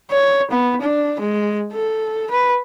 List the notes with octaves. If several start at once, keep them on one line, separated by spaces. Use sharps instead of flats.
C#5
B3
D4
G#3
A4
B4